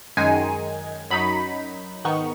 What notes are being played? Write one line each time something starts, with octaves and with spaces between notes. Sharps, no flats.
F#2 D#3 G#3 D#4 G#5
F#2 F#3 D#4 B5
G#2 D#3 B3 D#4 C#6